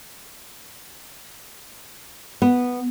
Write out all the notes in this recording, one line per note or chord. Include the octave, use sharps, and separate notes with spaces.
B3